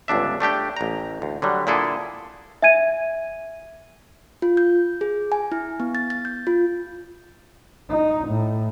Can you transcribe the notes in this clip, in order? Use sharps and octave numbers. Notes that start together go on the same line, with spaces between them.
G1 C#2 D4 E5
A3 D4 G4 G5
A1 A#5
D2
D3 F#3 G3
A#2 D3 E4 G#4 A4
E5 G#5 G#6 D#7
F4
G6
G#4
G#5
E4
B3
A6
A6
G6
F4
D#4
A2